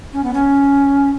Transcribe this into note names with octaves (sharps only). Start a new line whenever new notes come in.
C#4
B3
C#4